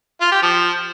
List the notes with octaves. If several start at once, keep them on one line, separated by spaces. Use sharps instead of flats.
F4
G4
F3